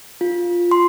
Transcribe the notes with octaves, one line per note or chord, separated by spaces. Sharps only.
F4
C6